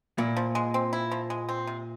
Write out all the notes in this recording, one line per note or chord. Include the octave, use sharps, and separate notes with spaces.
A#2 E4
F3
G#3
C4
E4
F3
G#3
C4
C3